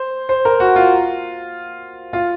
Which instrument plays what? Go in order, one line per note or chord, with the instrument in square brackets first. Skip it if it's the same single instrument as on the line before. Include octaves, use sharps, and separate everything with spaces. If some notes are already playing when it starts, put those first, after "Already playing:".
Already playing: [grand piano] C5
C5
A#4
F#4
F4
F4